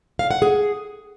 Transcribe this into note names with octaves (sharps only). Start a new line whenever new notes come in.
F5
F#5
G#4